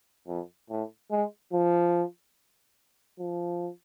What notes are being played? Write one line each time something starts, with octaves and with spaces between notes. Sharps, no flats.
F2
A2
G#3
F3
F3